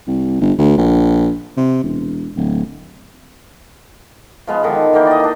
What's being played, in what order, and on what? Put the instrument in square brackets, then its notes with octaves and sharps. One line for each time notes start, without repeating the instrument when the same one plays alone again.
[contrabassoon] C2
G1
D2
A#1
C3
E1
D1
[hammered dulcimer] F3 G#3 B3
D3 D#3
D3 E3 A#3 G5
D5 D#5
D4 D#4